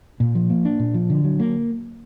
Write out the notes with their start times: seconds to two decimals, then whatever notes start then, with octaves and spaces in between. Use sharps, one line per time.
0.20 A#2
0.35 F3
0.50 A#3
0.65 D4
0.79 A#2
0.94 F3
1.10 D3
1.24 F#3
1.40 A#3